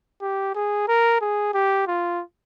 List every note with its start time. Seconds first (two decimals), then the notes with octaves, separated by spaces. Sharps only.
0.22 G4
0.55 G#4
0.88 A#4
1.21 G#4
1.54 G4
1.87 F4